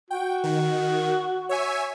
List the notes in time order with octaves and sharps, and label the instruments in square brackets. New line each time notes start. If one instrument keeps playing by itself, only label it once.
[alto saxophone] F#4 [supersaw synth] G5
[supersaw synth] D#3
C#5 E5 G#5